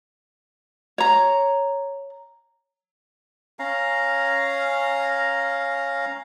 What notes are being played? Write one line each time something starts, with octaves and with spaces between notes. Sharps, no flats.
C#5 A#5
C#4 F5 A#5